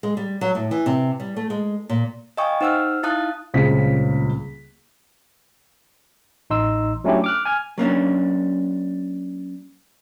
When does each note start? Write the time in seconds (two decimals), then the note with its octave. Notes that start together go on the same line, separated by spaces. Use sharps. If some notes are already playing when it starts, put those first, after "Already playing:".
0.03 G#3
0.17 G3
0.41 F#3
0.55 A2
0.71 E3
0.86 C3
1.20 G3
1.36 A3
1.50 G#3
1.89 A#2
2.37 D#5 F5 G5 G#5 C#6 D#6
2.61 D#4 C5 F#5 E6 F6
3.03 D#4 E4 F5 A5 D#6 F#6
3.54 D#1 C#2 C#3 C4 F4 B6
6.50 A1 D#4 C6 E6
7.04 F#3 A3 C#4 D4 E4 G4
7.24 D6 F6 F#6
7.45 G#5 F6 G#6
7.78 F#3 A#3 C#4 D4